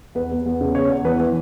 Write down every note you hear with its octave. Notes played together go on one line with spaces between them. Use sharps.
E2 B4
E2
E2
C#3
E2 C#5
E2
E3 B4
E3